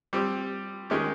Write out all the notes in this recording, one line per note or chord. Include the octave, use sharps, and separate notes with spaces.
G3 C4 G4
D#3 G#3 C#4 G4